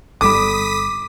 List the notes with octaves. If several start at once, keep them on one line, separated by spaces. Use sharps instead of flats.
G1 G3 A4 B5 D6 D#6 B6